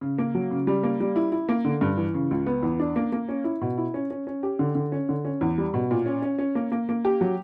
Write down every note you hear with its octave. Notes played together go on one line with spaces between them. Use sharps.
C#3
A#3
F#3
C#3
G3
A#3
G3
E4
E4
A#3
D3
G2
E3
C#3
C#2
B3
E2
D4
A#3
A#3
C#4
E4
B2
E4
C#4
C#4
C#4
G4
D3
D3
C#4
D3
C#4
E2
G3
B2
A#2
C#4
C#4
C#4
A#3
A#3
A#3
G4
F#3